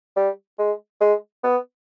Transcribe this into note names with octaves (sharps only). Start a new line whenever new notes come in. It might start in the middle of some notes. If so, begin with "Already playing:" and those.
G3
G#3
G#3
B3